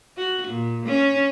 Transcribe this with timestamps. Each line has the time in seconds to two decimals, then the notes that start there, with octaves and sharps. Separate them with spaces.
0.17 F#4
0.48 A#2
0.86 C#4